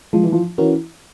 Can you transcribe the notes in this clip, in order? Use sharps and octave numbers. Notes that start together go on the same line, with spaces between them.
F3 G#3
E3
F3
E3 C#4 F#4 A#4